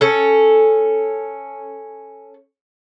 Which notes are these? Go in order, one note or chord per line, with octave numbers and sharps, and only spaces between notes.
C#4 A4